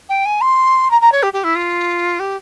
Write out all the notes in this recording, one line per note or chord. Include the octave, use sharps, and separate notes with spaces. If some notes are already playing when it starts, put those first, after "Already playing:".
G5
G#5
C6
A#5
A#5
C#5
G4
G4
E4
F4
G4